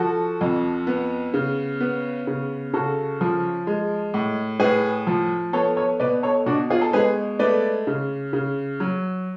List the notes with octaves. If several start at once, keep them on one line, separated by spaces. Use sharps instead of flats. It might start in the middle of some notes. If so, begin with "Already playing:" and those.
Already playing: F3 F#4 A4
F2
B3
C#3
B3
C#3
C#3 F#4 A4
F3
G#3
A2
A2 G#4 B4
F3
B3 A4 C#5
A4 C#5
B2 B4 D5
A4 C#5
B2 D4 F#4
F4 G#4
A4
G#3 G#4 B4
A3 B4 D5
C#3
C#3
F#3